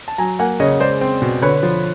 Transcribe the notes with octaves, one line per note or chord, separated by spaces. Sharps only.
A5
F#3 G#5 A#5
A#3 F#5 G#5
C#3 C#5 D#5
G#3 C5 D5
C4
B2
D3 B4 C#5
F3